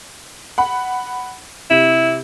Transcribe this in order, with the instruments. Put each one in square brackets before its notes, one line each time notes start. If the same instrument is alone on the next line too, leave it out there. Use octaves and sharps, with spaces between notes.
[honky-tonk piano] F#5 B5
[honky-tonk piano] C3 [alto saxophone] E4